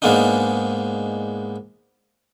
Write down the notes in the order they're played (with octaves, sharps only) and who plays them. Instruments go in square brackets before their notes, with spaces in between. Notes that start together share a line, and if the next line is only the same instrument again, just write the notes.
[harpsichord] G#2 G#3 A#3 B3 D4 D#4